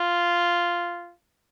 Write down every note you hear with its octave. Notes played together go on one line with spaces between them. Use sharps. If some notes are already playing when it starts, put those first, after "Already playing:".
Already playing: F4